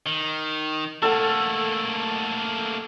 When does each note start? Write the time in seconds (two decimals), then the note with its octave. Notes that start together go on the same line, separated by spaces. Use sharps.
0.06 D#3
1.02 A3 A#3 A4 F#5 A5